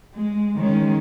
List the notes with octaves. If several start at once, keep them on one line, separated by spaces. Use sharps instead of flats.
G#3
D#3 G#3 C#4